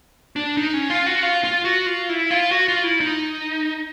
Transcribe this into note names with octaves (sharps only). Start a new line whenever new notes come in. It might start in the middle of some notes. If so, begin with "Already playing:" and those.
D4
D#4
C#4
F4
F#4
F4
F4
F#4
F4
E4
F4
F#4
F4
E4
D#4